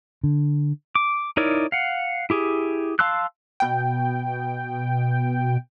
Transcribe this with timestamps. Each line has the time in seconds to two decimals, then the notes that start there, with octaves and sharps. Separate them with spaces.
0.24 D3
0.95 D6
1.37 D#4 E4 A#4 C#5 D5
1.72 F5 F#5
2.30 E4 G4 G#4
2.99 F5 A5 C6 E6 F#6
3.60 B2 G5